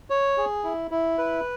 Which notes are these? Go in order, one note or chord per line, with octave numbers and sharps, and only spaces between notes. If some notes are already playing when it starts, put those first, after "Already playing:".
C#5
G#4
E4
E4
B4